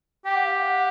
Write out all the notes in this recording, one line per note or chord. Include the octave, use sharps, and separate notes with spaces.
G4 G5
F#5
F5
F#5